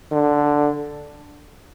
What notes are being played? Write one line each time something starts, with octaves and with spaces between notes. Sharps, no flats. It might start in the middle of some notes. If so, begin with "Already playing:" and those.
D3